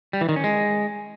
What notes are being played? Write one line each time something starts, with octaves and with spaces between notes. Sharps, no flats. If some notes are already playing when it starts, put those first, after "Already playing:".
G3
E3
D#3
C#4
G#3